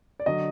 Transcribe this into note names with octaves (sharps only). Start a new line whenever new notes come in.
D5
D3 F#3 D#5